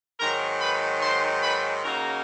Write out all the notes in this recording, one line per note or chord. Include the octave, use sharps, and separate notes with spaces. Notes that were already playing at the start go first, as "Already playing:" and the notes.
G#2 D#3 F#3 A#4 A#5
B4 B5
C5 C6
B4 B5
C#3 F#3 A#3 D#4 A#4 A#5